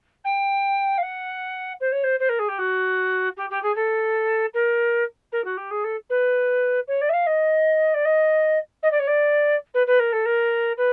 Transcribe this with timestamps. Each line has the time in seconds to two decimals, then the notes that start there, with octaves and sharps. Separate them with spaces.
0.24 G5
0.97 F5
1.02 F#5
1.80 C5
1.92 C#5
2.03 C5
2.19 C5
2.29 A#4
2.38 G#4
2.48 G4
2.58 F#4
3.36 G4
3.50 G4
3.62 G#4
3.75 A4
4.53 A#4
5.32 A#4
5.44 F#4
5.57 G4
5.70 G#4
5.83 A4
6.09 B4
6.87 C#5
7.01 D5
7.09 E5
7.13 F5
7.26 D#5
7.94 D5
8.05 D#5
8.82 D#5
8.91 D5
8.99 C#5
9.07 D5
9.74 B4
9.86 B4
9.99 A#4
10.12 A4
10.25 A#4
10.77 B4